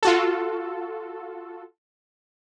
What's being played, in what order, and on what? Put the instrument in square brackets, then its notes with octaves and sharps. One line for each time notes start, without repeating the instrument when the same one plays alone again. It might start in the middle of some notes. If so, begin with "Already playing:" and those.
[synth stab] F4 F#4 A4